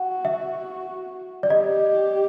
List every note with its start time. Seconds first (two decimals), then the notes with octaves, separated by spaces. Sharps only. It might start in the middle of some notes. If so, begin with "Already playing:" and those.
Already playing: F#4 F#5
0.25 E5
1.43 D5
1.50 G4 D#5